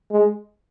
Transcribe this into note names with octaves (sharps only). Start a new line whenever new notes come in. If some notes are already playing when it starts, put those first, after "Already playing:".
G#3